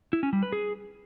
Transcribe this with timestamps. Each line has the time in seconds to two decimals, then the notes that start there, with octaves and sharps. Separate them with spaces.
0.13 E4
0.23 C#4
0.33 G3
0.43 B4
0.53 G#4